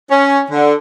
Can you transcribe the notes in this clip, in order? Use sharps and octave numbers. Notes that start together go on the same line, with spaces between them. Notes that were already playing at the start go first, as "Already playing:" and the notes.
C#4
D3